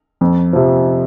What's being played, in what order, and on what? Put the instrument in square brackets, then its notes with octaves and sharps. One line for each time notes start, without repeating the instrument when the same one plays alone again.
[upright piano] F2
C3 F3